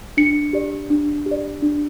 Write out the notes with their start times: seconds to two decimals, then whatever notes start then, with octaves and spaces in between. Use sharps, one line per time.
0.17 D4 C#7
0.53 G4 D5
0.90 D4
1.26 G4
1.31 D5
1.62 D4